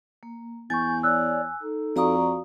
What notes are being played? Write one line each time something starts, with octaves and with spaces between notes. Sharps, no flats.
A#3
E2 G#5 C#6 G6 A6
C#5 D5 E6 F#6
D#4 A4
F2 F#4 D5 F5 A#5 C#6 D#6